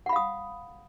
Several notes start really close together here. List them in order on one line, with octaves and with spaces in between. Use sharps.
F#5 B5 F5 D#6